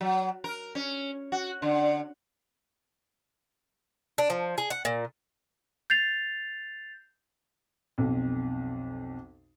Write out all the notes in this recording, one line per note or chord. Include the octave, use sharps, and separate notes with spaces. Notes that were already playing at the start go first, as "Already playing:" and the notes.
F#3
A#4
C#4
F#4
D3
D4
F3
G#4
F#5
A#2
G6 A6 C7 F7
B1 F2